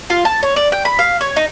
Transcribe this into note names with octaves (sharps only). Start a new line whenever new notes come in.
F4
A5
C#5
D5
G5
B5
F5
C#5
D#4